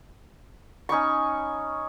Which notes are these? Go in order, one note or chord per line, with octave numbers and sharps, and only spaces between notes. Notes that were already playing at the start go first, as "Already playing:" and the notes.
C#4 D#4 B5 C#6